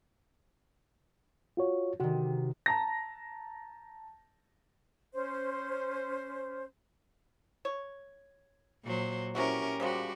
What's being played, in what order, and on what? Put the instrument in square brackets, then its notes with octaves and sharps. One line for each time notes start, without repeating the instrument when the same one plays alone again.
[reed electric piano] F4 F#4 C#5
[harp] C3 D#3 [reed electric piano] F#4
[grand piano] A5 A#5 A#6
[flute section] C#4 C5
[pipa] C#5
[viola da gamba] A#2 F#3 C5
[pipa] C3 E3 F#4 [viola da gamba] C#4 G4 A#4
[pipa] C#3 F3 G#3 [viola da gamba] G3 F#4 G4